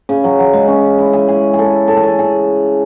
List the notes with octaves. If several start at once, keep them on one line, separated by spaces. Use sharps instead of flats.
C#3
F#3
F#3
G#3
C#4
E4
G#4
G#4
G#4
A4
A4
G#4
A4
G#4